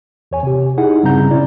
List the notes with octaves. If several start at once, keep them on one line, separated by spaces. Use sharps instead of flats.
E2 C#5 G#5
C3 G4
D#4 E4 G#4 F#5
G2 C#3 G3 C4 A#5 G6
B2 C#4 E4 D5